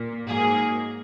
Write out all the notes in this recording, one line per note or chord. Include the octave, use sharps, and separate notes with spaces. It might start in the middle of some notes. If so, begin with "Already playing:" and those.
Already playing: A#2 A#3
G#2 F#3 A#3 G#4